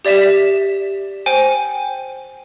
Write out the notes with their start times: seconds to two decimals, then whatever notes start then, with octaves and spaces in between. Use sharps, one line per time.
0.05 G4 D5 E5 B6 E7
1.26 C5 G5 G#5